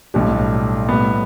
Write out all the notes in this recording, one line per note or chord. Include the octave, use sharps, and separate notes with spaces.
B1 A2 G3 D4 G4
A2 G3 B3